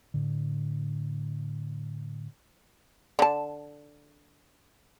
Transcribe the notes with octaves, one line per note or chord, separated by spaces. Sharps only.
A2 D3
D3 A5